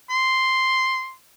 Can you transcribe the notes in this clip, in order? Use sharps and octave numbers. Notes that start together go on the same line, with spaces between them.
C6